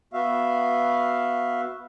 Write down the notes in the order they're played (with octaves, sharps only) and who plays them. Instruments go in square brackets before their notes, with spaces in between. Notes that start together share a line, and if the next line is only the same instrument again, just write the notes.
[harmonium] B3 F#4 E5 F5